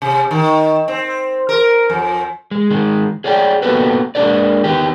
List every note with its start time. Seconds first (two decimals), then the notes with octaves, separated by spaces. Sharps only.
0.02 C3
0.31 D#3
0.88 C4
1.49 A#4
1.90 F2
2.51 G#3
2.70 D#3 G#3
3.24 G#4 C#5 D5 F#5 G5
3.62 A#3 B3 F#4 G4 A4 B4
4.15 G#3 A#3 D4 G4 A#4 D5
4.64 D#3 B3 G4